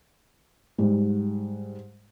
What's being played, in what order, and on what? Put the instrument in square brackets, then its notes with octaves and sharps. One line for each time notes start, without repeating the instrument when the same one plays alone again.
[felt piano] G#2 G3